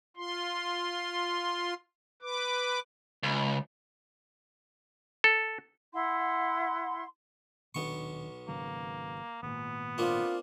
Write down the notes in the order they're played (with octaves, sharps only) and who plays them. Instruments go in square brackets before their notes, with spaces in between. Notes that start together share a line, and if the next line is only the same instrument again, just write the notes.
[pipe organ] F4 C6
B4 D6
[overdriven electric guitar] C#2
[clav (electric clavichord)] A4
[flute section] E4 F#5 C6
[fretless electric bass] D#1 D#3 D4 [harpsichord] B1 B3 C#6
[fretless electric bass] G#1 C#3 F#3 [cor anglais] A#3
[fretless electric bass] G#1 A#2 [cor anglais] B3
[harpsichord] A#3 C4 D4 [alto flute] F4